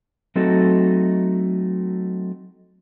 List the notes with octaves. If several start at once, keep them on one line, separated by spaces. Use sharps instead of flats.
F#3 A3 C4 D#4 F#4 A4